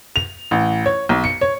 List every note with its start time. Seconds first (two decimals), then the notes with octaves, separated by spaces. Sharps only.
0.16 F7
0.51 A1
0.86 C#5
1.09 B1
1.24 C#7
1.41 C#5